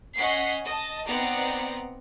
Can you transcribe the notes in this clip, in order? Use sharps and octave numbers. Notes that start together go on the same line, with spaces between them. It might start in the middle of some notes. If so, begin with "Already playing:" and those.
C#4 D#5 F#5 B6 C7
D#5 A5
B3 C4 D#4 D5 F#5 A#5